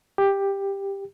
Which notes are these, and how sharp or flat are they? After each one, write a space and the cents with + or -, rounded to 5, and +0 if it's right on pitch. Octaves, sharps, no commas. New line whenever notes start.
G4 +10